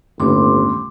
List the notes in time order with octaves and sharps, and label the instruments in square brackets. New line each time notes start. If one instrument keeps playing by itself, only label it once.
[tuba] G1 [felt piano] D#2 A2 C#3 [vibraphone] C6 D6